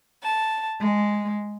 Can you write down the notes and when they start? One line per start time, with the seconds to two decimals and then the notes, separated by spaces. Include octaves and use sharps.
0.24 A5
0.80 G#3